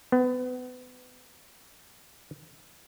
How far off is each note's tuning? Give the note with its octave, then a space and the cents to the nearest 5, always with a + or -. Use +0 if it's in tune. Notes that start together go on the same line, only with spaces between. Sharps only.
B3 +30